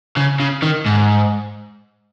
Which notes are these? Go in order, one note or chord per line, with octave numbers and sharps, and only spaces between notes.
C#3
C#3
D#3
G#2